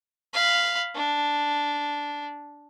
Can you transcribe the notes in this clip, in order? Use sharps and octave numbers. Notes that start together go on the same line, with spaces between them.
F5 B5
D4